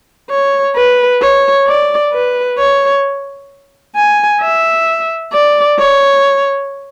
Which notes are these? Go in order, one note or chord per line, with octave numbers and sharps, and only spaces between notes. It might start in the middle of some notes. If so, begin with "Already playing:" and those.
C#5
B4
C#5
D5
B4
C#5
G#5
E5
D5
C#5